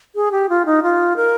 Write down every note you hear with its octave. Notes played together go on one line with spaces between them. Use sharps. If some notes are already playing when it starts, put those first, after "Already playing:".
G#4
G4
F4
D#4
F4
A#4